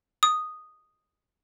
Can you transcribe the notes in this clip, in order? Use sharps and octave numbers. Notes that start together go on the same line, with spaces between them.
D#6